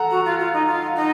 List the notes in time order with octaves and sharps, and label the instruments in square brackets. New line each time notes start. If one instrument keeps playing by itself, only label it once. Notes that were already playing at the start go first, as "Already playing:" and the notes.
Already playing: [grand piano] A4 F#5 A#5
[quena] F#4
F4
F4
D#4
F4
D#4